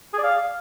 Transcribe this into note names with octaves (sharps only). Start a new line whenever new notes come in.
G#4
D5
F5